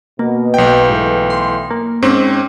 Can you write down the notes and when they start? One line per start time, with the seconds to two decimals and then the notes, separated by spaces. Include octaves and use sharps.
0.19 B2 A#3
0.54 B1 G5
0.90 G#2 E3 A3
1.30 C6
1.71 A#3
2.02 G#2 C4 C#4 C5